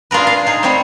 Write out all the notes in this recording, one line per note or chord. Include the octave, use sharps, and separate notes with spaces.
D4 F4 G#4 A#4 B4
F5
D#4 G#4
G3 C4 D#4 C5 C#5